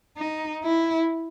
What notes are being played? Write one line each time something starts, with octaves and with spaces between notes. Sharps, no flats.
D#4
E4